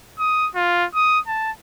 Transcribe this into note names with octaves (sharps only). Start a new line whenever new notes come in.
D#6
F4
D#6
A5